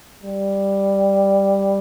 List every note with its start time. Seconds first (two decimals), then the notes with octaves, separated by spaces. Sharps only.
0.23 G3